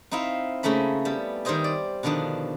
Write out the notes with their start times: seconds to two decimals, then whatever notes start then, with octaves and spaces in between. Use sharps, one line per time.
0.11 C4 D#4 E4 E5 F5
0.63 C#3 A3 A#3 C#4 B5
1.05 G3 B3
1.45 D#3 G3 G4 C5 D#5 G#5
1.64 D5
2.03 B2 D3 D#3 F3 D4